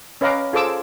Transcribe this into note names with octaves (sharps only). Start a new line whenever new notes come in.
C#4 B4 D#5 F5 A#5 D6
F4 G#4 A4 C5 D6 E6